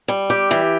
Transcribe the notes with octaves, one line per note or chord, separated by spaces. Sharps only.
G3
G4
E3